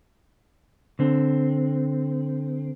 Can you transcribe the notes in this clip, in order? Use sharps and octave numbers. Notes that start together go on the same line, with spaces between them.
D3 C4